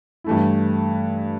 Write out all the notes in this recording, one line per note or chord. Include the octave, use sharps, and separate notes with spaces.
G2 E3 A3 E4